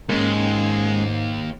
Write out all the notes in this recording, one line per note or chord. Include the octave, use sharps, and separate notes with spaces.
D#2 G#2 G#3 A#3 C#4